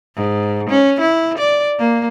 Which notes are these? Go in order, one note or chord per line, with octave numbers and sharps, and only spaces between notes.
G#2
C#4
E4
D5
A#3